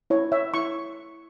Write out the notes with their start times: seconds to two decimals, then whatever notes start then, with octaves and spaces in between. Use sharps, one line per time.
0.10 E4 C#5
0.32 C#5 E5
0.54 E4 C#6